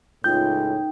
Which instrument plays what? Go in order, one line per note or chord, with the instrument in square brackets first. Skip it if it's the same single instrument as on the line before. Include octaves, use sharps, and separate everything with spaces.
[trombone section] C#2 A2 [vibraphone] D#4 G5 [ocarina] F4 [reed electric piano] G6